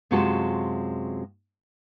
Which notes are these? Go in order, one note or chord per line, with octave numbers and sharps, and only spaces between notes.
F#2 C3 G#3 F4 F#4 A5